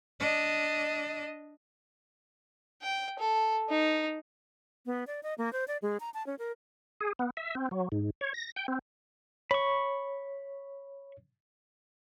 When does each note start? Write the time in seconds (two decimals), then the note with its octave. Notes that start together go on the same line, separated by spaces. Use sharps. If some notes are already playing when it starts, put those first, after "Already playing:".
0.19 D4 D#5
2.82 G5
3.19 A4
3.70 D#4
4.86 B3
5.07 D5
5.23 D#5
5.38 A#3
5.53 C5
5.68 D5
5.82 G#3
6.00 A#5
6.14 A5
6.27 C#4
6.39 A#4
7.01 G#4
7.19 B3
7.37 E5
7.55 C4
7.71 F#3
7.92 G#2
8.21 C#5
8.34 A#6
8.56 G5
8.68 C4
9.51 C#5 B5 C#6